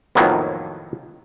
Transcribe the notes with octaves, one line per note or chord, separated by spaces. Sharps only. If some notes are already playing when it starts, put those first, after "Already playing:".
F2 A2 D#3 F#3 A#3 B3